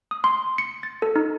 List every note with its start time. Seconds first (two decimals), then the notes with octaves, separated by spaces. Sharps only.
0.11 D#6
0.24 C6
0.58 C#7
0.83 A6
1.02 A4
1.16 D#4